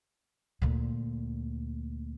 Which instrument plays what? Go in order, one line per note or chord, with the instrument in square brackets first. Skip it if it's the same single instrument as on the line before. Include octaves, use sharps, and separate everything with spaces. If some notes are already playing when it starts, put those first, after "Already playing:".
[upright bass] D2 A#2